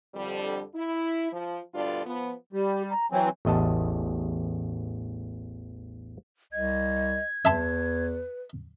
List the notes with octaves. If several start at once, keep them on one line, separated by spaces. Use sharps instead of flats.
F2 D3 G3
E4
F3
D2 G2 B2 D3 F4 D5
F3 B3
G3 G4
A#5
E3 F#3 C4 G#5
A1 E2 D#5 A5
C2 D#5 G#6
E2 B4 E5 A5 C6